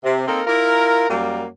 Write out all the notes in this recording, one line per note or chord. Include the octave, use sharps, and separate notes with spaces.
C3
A#3 C4 D#4 A4 A#4
E4 F4 A#4
F#2 G3 A#3